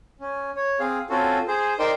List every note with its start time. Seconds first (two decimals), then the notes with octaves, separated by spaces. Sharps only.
0.20 C#4
0.56 C#5
0.80 C4 G#4 F5
1.10 C4 C#4 F4 F#4 A4
1.48 G#4 C5
1.79 D#4 A#4 C5 D5 G5 C6